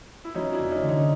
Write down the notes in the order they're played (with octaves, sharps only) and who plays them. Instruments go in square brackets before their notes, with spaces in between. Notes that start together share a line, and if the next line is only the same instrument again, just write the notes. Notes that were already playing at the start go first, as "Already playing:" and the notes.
[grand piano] E4
[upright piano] F#3 [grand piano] C#4 D#4
[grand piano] D4 E4
[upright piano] F1
[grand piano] C#4 D#4
[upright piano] D3
[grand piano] C#4 D#4